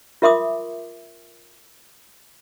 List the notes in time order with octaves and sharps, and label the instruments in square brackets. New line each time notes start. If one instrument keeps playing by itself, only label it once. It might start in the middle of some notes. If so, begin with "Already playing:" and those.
[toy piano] F4 A#4 E5 C6 D6 D#6